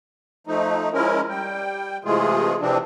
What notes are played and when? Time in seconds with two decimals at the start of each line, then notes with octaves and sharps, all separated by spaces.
0.47 F3 A3 D#4
0.93 F3 G#3 C#4 E4 A#4
1.29 G3 G5
2.05 C3 E3 G#3 A3 F4 G#4
2.61 C3 E3 F3 C4 D4